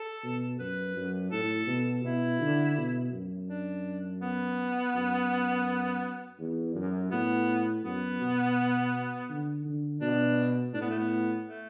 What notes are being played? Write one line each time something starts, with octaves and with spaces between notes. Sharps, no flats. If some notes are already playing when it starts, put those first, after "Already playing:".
Already playing: A4
B2
F#2 B4
F#2
A2 A4
B2
B2 E4
D3
B2
F#2
D4
B3
F#2
E2
F#2
A2 B3
F#2 B3
B2
D3
D3
B2 D4
A2 D4
B3
A3
B3
A3